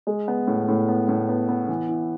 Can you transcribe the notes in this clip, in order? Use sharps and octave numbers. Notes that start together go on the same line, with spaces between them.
G#3
B3
A2
A2
B3
A2
B3
B3
E3
E4